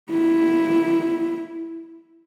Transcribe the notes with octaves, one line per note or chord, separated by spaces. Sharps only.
E4